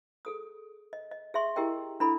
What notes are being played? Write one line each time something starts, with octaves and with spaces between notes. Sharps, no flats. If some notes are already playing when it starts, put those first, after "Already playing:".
G#4 A4 D#6
D#5
D#5
G#4 E5 C6 C#6
E4 G4 G#4 A#4 D#5 G5
D4 E4 A4 B5